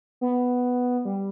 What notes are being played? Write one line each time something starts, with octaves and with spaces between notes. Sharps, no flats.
B3
G3